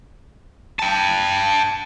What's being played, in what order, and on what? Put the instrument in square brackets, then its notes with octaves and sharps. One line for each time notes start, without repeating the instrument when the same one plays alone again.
[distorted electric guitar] G5 A5